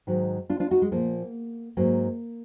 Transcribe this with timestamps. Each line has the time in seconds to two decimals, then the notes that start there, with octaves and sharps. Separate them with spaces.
0.07 G#2 D#3 F#3
0.50 D4 F4
0.60 D4 F4
0.71 D#4 F#4
0.82 G#3
0.92 A#2 F3 A#3
1.77 G#2 F#3 A#3